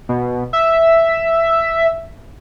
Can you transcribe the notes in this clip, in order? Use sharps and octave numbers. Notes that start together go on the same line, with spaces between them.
B2
E5